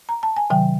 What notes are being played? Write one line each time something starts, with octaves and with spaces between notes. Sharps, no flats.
A#5
A5
G#5
C3 D#3 F#3 G5